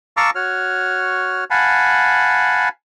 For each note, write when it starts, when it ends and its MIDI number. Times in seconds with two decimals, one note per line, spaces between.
0.17 0.30 77
0.17 0.30 81
0.17 0.30 82
0.17 0.30 85
0.17 0.30 86
0.17 0.30 88
0.35 1.44 66
0.35 1.44 73
0.35 1.44 89
1.50 2.69 77
1.50 2.69 78
1.50 2.69 80
1.50 2.69 81
1.50 2.69 83